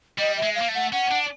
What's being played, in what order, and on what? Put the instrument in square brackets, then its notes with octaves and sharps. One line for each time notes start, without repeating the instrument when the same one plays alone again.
[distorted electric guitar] G3 [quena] D#5
[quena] E5
[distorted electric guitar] G#3
[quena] F5
[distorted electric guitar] A#3
A3
[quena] F#5
[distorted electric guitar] C#4 [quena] F#5
[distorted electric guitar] D4